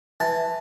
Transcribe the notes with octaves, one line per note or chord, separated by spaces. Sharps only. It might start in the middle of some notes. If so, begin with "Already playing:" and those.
E3 A5